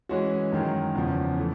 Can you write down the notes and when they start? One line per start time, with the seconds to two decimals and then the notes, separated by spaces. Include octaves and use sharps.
0.09 E3 G#3 C#4 F#4
0.52 F#2 D#3 G#3
0.95 E2 C#3 F3
1.37 E3 A3